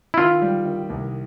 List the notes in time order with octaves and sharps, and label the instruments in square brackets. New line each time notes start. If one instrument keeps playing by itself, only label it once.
[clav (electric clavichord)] E4
[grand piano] D#3 [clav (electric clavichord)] F4
[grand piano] G3
D#3
C2